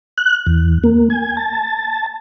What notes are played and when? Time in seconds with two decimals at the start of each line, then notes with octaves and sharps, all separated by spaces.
0.18 F#6
0.47 E2
0.84 A#3
1.10 G#5
1.37 A5